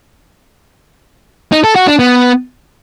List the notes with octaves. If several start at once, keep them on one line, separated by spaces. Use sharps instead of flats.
D#4
A4
F#4
D4
B3